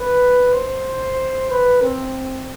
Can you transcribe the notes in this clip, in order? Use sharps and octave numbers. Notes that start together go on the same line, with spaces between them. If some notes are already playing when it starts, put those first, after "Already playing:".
Already playing: B4
C5
B4
C4